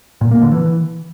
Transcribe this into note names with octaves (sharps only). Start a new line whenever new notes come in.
A#2
A#3
D3
E3